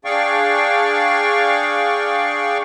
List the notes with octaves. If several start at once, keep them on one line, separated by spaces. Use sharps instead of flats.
D4 G#4 D5 F5 G5 C#6